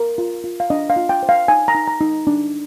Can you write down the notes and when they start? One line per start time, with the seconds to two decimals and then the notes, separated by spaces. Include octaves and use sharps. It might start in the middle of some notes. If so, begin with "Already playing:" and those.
Already playing: A#4
0.18 F4
0.44 F4
0.60 F5
0.70 D4 D#5
0.90 F5
0.96 F4
1.09 G5
1.23 C5
1.29 F5
1.48 D#4 G#5
1.68 A#5
1.75 D#4
1.88 A#5
2.01 D#4
2.27 D4